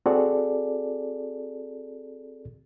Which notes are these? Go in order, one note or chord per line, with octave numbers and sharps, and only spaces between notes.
C4 F#4 G#4 A4 D5